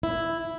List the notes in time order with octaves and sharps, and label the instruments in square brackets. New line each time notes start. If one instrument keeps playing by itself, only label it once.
[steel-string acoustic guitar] E4